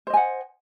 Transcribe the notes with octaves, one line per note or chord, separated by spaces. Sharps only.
C5 D#5 F#5 G#5